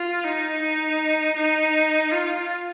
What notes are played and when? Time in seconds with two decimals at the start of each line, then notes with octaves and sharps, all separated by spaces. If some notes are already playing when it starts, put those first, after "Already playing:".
Already playing: F4
0.24 D#4
0.62 D#4
1.36 D#4
2.11 F4